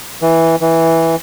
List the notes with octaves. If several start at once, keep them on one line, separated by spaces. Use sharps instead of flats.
E3
E3